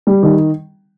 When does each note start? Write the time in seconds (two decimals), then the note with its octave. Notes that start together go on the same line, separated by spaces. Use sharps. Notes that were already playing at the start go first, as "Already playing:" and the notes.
0.07 G3
0.23 D#3